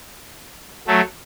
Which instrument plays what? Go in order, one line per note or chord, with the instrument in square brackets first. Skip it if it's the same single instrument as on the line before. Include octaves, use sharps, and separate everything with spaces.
[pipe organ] F#3 A3